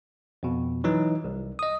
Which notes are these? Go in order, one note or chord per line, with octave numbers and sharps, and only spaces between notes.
F2 B2
E3 F#3 D#4
C2
D#5 D#6